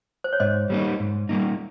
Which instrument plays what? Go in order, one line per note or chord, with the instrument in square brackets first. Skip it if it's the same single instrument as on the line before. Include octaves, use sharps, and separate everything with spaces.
[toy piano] C5
C#5
[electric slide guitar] G#2 [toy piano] C5 D#5
[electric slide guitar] G3 A#3 D#4
G#2
G3 A#3 D#4